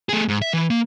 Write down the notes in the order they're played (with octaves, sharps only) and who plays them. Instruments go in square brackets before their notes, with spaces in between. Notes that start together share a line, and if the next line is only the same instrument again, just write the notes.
[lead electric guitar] A3 G#4
G#2
E5
E3
A#3